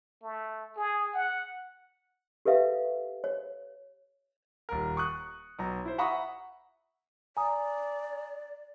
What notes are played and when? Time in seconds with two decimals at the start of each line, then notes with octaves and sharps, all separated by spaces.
0.22 A3
0.77 G#4
1.14 F#5
2.45 G4 A4 B4 E5 F5
3.24 C#5
4.69 D#1 A#4
4.97 C#6 D#6 F#6
5.59 B1 A#5
5.85 E4 C5
5.98 E5 F#5 A#5 B5 C#6 D#6
7.37 D5 G#5 A#5 D#6